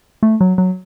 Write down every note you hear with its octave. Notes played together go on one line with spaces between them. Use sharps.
A3
F#3
F#3